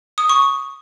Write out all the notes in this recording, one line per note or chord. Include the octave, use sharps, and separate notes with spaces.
D#6
C#6